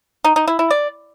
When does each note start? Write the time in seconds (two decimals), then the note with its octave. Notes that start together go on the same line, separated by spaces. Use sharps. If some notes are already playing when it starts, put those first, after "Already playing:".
0.25 D#4
0.36 D#4
0.48 E4
0.59 E4
0.71 D5